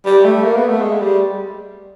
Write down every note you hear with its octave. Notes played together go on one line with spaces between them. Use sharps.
G3
A3
A#3
B3
A3
G#3
G3